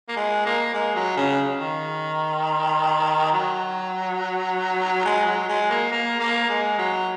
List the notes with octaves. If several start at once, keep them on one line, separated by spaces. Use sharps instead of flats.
A#3
G#3
A#3
G#3
F#3
C#3
D#3
F#3
G#3
F#3
G#3
A#3
A#3
A#3
G#3
F#3